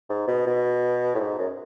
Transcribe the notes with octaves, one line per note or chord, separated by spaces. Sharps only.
G#2
B2
B2
A2
G#2
F#2